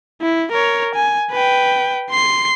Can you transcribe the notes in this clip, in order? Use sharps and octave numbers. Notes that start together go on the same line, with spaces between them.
E4
A#4 C#5
G#5
B4 G5
C6 C7